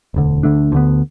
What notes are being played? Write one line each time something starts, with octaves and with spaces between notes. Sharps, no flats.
E1 D2 D3
D2 D3 A3 D4
D2 D3 B3